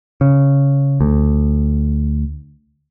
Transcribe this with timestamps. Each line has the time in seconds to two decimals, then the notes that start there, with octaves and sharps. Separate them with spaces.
0.21 C#3
1.01 D2